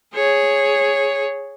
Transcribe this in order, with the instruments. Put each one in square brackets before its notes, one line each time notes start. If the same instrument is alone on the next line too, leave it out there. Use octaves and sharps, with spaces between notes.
[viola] G#4 C#5